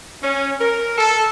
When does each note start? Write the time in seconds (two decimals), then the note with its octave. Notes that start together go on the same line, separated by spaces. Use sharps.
0.22 C#4
0.61 A#4
0.98 A4